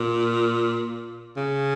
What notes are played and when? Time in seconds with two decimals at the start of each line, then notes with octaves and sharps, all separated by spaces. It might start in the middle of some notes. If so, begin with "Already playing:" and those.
Already playing: A#2
1.37 C#3